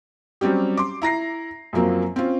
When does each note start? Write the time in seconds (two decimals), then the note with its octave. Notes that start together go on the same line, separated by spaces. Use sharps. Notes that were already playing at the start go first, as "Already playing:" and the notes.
0.41 F#3 G3 C4 C#4 G4
0.77 C6 D6
1.02 E4 A#5 A#6 C7
1.73 F#2 F3 F#3 A#3 C4
2.16 C4 C#4 F4